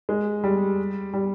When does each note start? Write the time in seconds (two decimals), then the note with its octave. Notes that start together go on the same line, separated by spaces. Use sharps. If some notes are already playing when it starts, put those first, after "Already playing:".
0.09 G#3
0.44 G3
1.14 G3